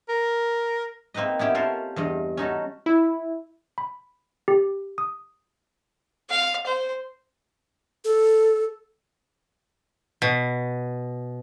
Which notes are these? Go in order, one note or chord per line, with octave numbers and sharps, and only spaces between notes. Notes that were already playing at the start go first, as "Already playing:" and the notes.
A#4
A#3 C4 D#4 B4 D#5
B3 C#4 E4 G4
C#4 F4 A4 A#4 C5
E2 G2 D#5
C#4 D#4 F#4 A4
E4
B5
G4
D#6
F5
C5
A4
B2